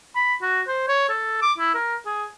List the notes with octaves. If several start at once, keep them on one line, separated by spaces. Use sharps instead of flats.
B5
F#4
C5
C#5
A4
D6
E4
A#4
G#4